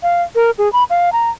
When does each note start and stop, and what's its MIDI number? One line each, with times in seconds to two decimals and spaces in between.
0.03 0.22 77
0.35 0.51 70
0.58 0.71 68
0.73 0.84 83
0.90 1.10 77
1.13 1.30 82